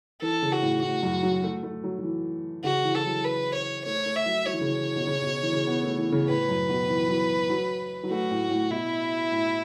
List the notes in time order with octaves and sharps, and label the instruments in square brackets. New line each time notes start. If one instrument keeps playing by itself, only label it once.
[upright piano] E3 [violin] A4
[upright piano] C#3
[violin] F#4
[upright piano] A2
[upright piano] A2 [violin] F#4
[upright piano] F#2
F#3
A3
A3
F#3
F#3
E3
[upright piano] C#3 [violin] F#4
[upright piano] E3
[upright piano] E3 [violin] A4
[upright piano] F#3
[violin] B4
C#5
[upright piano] A3 [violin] C#5
[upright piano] A3
[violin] E5
[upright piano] F#3
[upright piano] F#3 [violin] C#5
[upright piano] E3
C#3
E3
B2
C#3
B2
E3
C#3
B3
A3
E3
C#3
[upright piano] A2 [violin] B4
[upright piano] F#2
B2
E3
F#3
F#3
F#3
[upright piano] A3 [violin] F#4
[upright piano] A2
A2
[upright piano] B2 [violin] E4
[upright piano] A2